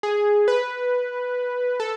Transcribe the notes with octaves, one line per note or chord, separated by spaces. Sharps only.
G#4
B4
A4